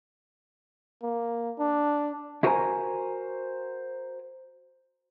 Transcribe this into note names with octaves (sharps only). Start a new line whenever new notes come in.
A#3
D4
E4 F#4 A#4 C5 G#5 A#5